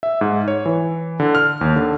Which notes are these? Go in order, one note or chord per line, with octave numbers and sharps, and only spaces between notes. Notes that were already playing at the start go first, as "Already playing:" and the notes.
E5
G#2
C#5
E3
D3
F6
D#2
D3